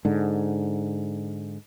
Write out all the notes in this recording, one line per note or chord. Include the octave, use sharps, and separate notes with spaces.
G#2 D3